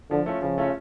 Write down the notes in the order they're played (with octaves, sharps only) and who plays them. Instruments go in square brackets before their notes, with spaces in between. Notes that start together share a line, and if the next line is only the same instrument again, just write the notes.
[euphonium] D3 [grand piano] F3
[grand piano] A3 C#4 F4
[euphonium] C#3 [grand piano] F3
[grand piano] A3 C#4 F4